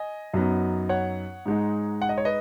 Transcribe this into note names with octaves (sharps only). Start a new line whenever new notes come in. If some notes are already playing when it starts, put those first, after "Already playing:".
Already playing: D#5 G#5
F#2 F#3 B3 D#4
C#5 F#5
G#2 G#3 D#4
F#5
D#5
C#5
B4 D#5